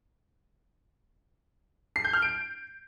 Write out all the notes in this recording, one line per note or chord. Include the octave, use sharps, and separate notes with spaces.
C7
G6
F6
D7